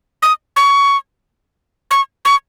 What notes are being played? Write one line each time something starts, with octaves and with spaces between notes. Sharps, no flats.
D#6
C#6
C#6
C#6